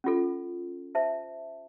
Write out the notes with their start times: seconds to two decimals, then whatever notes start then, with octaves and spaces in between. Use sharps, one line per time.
0.04 C#4 F4 A4
0.95 C5 E5 A5